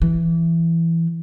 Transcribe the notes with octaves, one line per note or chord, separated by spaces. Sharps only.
E3